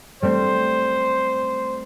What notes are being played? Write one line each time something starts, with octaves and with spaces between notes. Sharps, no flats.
G3 A3 C4 C5